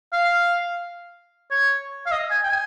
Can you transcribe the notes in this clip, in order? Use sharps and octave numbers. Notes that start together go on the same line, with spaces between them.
F5
C#5
F5
D#5
G#5
G5
G#5